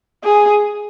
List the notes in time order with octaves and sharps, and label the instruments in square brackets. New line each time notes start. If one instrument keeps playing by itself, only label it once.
[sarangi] G#4